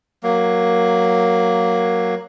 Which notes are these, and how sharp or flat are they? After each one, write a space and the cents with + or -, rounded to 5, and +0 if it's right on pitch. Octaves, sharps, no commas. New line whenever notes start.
F#3 +0 A#3 +0